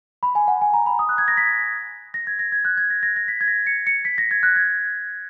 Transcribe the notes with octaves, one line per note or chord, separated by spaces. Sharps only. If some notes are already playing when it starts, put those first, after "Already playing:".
B5
G#5
F#5
G#5
A#5
B5
D#6
F#6
G#6
A#6
B6
A#6
G#6
A#6
G#6
F#6
G#6
A#6
A#6
A#6
B6
G#6
A#6
C#7
C#7
B6
A#6
G#6
F#6
G#6